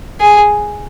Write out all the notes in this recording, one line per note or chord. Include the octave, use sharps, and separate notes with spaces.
G#4